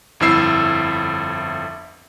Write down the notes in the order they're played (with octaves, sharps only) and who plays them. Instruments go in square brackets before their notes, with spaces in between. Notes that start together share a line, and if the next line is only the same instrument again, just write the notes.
[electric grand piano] G1 F2 E4 E5 E6 C7